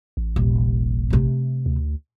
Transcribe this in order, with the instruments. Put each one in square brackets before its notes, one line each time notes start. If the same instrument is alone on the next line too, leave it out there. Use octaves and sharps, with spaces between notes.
[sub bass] A1
[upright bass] D#1 C3
C3 A3
[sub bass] D2